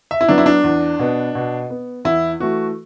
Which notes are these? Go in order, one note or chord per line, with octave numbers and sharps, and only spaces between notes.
E5
E4
F#3 B3 D4
E4
D4
E2
B2 B3
B2
B3
E2 E4
E3 A3 F#4